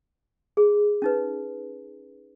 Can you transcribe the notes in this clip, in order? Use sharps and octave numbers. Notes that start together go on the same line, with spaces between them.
G#4
C#4 D#4 B4